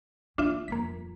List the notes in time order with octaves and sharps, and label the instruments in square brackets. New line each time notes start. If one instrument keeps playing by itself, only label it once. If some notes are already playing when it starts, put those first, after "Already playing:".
[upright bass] E3 A#3 [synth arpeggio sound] D4 F4 E5
[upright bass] D#1 F2 [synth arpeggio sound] A#3 B6